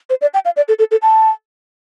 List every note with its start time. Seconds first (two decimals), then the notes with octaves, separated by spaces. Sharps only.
0.10 C5
0.21 D5
0.34 G5
0.45 F5
0.56 D5
0.68 A4
0.79 A4
0.91 A4
1.02 A5